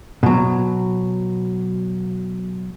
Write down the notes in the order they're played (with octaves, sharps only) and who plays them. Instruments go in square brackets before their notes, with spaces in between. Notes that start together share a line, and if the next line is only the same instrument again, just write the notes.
[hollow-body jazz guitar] B2 F#3